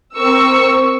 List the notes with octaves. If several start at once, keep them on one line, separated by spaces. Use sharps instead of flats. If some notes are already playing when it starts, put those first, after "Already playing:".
C4 A#4 C#6 E6